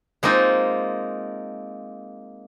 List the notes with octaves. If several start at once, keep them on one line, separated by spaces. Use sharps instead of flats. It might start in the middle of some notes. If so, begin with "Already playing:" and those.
G#3 A#3 C4 D#4 F4